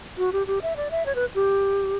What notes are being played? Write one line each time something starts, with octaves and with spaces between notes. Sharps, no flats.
F#4
G4
G4
E5
D5
E5
C#5
B4
G4